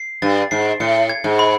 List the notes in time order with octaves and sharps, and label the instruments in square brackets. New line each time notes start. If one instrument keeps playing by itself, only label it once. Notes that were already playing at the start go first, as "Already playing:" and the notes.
Already playing: [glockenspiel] C7
[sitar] G2 [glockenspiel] A6
[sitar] G#2 [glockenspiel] C7
[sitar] A2 [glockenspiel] C#7
[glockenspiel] G#6
[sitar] G#2
[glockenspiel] B5